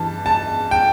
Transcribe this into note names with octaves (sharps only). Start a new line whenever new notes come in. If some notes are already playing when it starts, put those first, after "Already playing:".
Already playing: G2 E3 A5
A5
G5